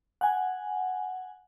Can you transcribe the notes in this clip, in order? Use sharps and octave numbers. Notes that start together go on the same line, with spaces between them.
F#5 G#5